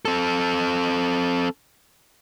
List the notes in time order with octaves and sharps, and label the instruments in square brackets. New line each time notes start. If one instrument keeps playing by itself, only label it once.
[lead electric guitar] C4 A4